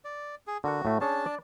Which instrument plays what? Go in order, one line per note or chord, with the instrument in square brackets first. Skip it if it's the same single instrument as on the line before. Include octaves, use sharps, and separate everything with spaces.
[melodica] D5
G#4
[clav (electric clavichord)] D3 A#4 F#5 [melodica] F#4
[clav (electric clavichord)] A2 A3
[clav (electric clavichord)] C#4 G#4 C#5 [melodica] D4 A5
[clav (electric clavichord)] D5